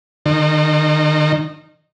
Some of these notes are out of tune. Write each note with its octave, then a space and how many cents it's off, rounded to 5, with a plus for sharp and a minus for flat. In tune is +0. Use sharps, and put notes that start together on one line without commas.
D#3 -35